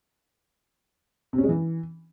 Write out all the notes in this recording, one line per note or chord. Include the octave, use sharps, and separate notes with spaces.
C3
C#4
G#3
E3